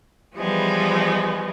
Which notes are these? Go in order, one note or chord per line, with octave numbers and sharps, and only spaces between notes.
E3 F3 G3 G#3 B3